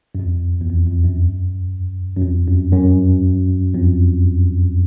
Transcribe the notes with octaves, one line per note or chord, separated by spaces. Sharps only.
F#2
F2
E2
F2
F2
F#2
F#2
F2
F#2
F#2
F2